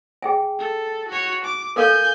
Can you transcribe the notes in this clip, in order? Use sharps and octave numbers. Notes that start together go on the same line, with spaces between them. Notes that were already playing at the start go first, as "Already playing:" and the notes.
G#4 G5 G#5
A4
F#4 C#5
D6
A4 A#4 F5 G#5 G6